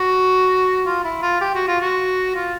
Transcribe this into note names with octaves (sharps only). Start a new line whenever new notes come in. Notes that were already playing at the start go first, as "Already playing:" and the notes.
Already playing: F#4
F4
E4
F4
G4
F#4
F4
F#4
F4